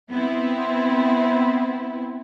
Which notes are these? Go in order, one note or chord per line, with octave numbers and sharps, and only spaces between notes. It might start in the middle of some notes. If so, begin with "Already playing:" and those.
B3 C4 E4